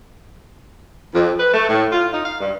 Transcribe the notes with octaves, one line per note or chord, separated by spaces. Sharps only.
F2
B4
A3
A2
F4
D#4
F5
G2